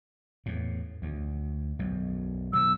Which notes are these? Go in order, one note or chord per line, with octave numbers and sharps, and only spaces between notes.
E2 A2
D2
B1 F#2
B2 F#3 E6